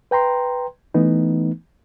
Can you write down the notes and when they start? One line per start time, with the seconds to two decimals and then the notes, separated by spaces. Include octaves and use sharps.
0.11 B4 G5 A#5 C6
0.94 E3 A3 B3 D#4